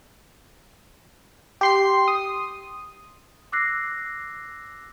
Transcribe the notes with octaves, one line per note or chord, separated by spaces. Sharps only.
G4 C6 C7
D#6
D6 E6 F#6 A#6 C7